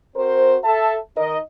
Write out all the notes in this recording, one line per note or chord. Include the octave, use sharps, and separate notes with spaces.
C4 F#4 A#4 C5
A4 E5 A5
D#3 D#4 A#4 D#5